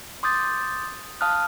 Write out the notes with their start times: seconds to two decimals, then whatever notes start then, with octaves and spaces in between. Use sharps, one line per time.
0.23 C6 D6 D#6 G6 A6
1.21 F5 A5 D#6 F6 F#6